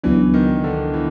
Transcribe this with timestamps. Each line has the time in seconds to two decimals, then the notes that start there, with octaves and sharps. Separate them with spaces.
0.04 C#2 C#3 E3 F#3 B3 D4
0.34 D#3
0.64 D3
0.94 E3